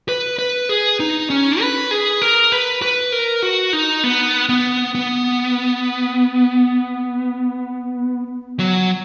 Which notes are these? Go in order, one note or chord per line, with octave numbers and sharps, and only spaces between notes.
B4
B4
G#4
D#4
C#4
B4
G#4
A#4
B4
B4
A#4
F#4
D#4
B3
B3
B3
F#3